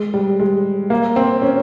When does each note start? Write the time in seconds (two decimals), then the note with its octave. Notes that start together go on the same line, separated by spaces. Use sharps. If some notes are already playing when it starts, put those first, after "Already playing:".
Already playing: G#3
0.14 G3
0.40 G#3
0.90 A#3
1.16 C4
1.42 C#4